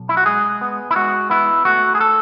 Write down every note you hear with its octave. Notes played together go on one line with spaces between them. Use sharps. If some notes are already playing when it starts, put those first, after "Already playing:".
Already playing: B1
E4
F#4
G#3 G#4
B3
E4
G#3 F#4
B3 E4
A3 F#4
G#4
A4